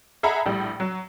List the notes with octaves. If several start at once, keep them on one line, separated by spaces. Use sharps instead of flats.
G#4 A4 E5 F#5 A#5 B5
A#1 A2 G3
F#3